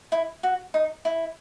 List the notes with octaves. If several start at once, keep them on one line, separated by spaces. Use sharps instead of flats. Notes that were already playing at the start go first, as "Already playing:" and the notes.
E4
F#4
D#4
E4